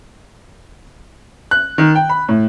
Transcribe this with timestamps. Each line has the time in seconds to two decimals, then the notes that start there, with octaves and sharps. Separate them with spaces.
1.51 F#6
1.78 D#3
1.95 G5
2.10 B5
2.29 A2